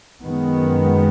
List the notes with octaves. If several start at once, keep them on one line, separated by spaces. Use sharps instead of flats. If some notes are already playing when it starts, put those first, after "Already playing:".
F#2 D#3 G#3 B3